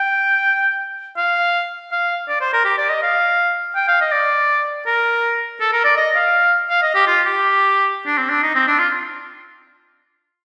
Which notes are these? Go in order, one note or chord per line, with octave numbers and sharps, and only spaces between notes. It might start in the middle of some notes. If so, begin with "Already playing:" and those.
Already playing: G5
F5
F5
D5
C5
A#4
G4
D5
D#5
F5
G5
F5
D#5
D5
A#4
A4
A#4
D5
D#5
F5
F5
D#5
G4
F4
G4
D4
C4
D4
D#4
C4
D4
F4